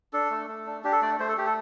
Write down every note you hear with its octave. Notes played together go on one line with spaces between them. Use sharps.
D4 A4
A3
A3
D4
D4 G4
A4
A3 D5
A3 C5
A4
A3 G4
A4